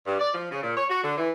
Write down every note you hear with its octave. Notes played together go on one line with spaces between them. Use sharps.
G2
D5
F3
C#3
A#2
C#5
F#4
D3
E3